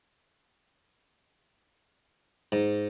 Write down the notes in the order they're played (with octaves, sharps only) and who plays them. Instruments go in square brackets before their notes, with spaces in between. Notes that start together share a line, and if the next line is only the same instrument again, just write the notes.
[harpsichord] G#2